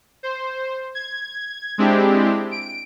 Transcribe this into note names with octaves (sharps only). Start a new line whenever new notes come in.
C5
G#6
G#3 C4 D4 E4 G4
D7